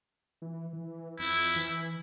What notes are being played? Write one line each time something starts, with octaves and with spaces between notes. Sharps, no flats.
E3
E3
F2 E4
E3